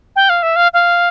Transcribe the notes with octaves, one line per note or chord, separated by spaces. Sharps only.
G5
F5
E5
F5
F5